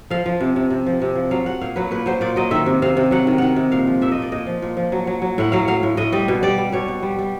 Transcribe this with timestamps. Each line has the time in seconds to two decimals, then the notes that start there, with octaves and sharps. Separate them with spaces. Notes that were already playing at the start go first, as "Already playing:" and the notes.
0.10 F3 F5
0.26 F3
0.40 C3
0.56 C3
0.70 C3
0.86 F3
1.02 C3
1.16 F3
1.31 F#3 F5
1.46 F#3 F#5
1.61 A#2 F5
1.76 F#3 B4
1.91 A#2 B4
2.06 F#3 C5
2.21 A#2 D5
2.36 F#3 D#5
2.51 D#3 E5
2.66 C3
2.82 C3 F5
2.97 C3
3.11 F#3 F#5
3.27 D#3
3.38 D#3 F#5
3.56 C3
3.72 A#2 F5
3.87 F3
4.01 A#2 E5
4.11 D#5
4.17 A#2
4.22 D5
4.32 A#2 D#5
4.46 F3
4.62 A#2
4.77 F3
4.92 F#3
5.07 F#3
5.22 F#3
5.38 A2 F#5
5.52 F#3 F5
5.68 F#3 F5
5.83 A2
5.97 A2 D#5
6.12 G3 D#5
6.28 B2
6.43 G3 D5
6.58 G3
6.72 B2 C#5
6.88 B2
7.03 G3
7.19 G3